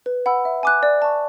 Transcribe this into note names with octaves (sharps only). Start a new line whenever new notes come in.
B4
F#5 B5 E6
E5
G#5 D6 F#6
D5
A5 C#6